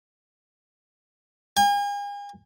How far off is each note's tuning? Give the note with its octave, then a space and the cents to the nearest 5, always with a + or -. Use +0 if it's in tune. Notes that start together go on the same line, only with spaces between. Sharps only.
G#5 -40